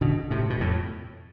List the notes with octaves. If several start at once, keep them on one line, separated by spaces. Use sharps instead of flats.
B2 D3
A2 C3
B2
F2 A2